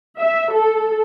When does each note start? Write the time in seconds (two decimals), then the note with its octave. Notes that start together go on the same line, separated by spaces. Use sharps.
0.19 E5
0.51 A4